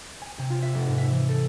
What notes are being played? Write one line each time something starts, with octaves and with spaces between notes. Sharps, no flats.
G#5
C3
F4
E5
F1
G#2
E5
E3
A4